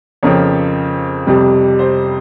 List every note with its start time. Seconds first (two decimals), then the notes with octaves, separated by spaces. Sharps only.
0.23 F2 C#3 F3 C4 A#4 C#5
1.27 F2 C3 G3
1.79 C5